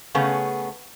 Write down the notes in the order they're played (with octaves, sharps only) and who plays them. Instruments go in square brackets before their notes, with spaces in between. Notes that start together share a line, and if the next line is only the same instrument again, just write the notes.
[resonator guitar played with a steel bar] C#3 A3 B3 C#4 G#4